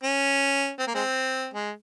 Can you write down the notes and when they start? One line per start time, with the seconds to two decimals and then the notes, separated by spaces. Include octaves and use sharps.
0.04 C#4
0.79 C4
0.87 A#3
0.95 G#3 C4
1.54 G#3